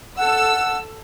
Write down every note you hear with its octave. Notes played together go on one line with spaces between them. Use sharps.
A4 F#5 E6